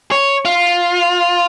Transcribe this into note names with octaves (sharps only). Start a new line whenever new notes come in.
C#5
F4